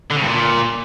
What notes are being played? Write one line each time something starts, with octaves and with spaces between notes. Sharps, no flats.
D3
C#3
G2
A#2